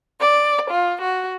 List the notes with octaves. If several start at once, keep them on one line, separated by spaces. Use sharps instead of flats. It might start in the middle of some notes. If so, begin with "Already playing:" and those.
D5
F4
F#4